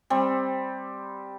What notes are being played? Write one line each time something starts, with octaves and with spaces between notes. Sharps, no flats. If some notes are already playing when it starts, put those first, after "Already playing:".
G3 C4